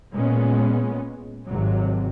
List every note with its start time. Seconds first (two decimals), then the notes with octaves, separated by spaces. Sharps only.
0.14 A#2 G#3 B3 C#4
1.46 G#1 C3 F#3